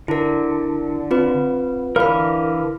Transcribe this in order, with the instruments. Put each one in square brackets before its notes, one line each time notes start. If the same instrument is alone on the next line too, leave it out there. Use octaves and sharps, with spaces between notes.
[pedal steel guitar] D3 [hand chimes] E4 A#4
[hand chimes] C4 F4 B4
[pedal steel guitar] D3 E3 A#4 [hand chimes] F5 B5